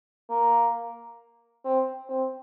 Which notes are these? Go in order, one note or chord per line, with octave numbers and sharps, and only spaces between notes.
A#3
C4
C4